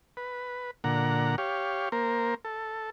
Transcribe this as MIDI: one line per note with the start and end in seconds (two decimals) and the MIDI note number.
0.17 0.71 71
0.84 1.36 46
0.84 1.36 50
0.84 1.36 78
0.84 1.36 82
1.38 1.89 67
1.38 1.89 73
1.38 1.89 77
1.92 2.35 58
1.92 2.35 70
1.92 2.35 72
2.45 2.90 69